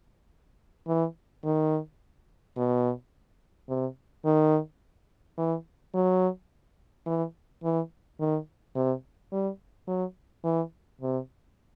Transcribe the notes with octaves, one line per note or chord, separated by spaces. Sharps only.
E3
D#3
B2
C3
D#3
E3
F#3
E3
E3
D#3
C3
G3
F#3
E3
C3